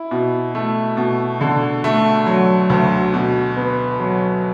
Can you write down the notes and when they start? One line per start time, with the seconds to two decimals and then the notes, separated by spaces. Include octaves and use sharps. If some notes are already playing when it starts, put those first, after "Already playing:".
Already playing: E4
0.11 B2
0.55 A3
0.97 B2
1.41 D3
1.84 A3
2.27 F#3
2.70 D2
3.14 B2
3.57 B3
4.00 F#3